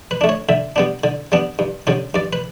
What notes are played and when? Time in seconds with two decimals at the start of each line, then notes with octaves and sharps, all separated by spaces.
0.11 B4
0.21 A3 D4
0.29 C#5
0.49 D3 E5
0.76 G3 B3 D4
1.04 D3
1.32 G3 B3 D4
1.59 G2
1.87 D3 G3 C#4
2.14 G2 D5
2.33 B4